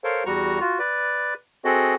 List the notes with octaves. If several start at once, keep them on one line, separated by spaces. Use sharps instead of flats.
A4 A#4 C5 C#5 F5
E2 G3 F#4 A#5 C#6
F4 F#4
B4 D5
C4 F#4 G#4 A4 D#5